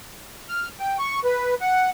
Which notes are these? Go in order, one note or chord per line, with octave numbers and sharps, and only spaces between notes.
F6
G5
C#6
B4
F#5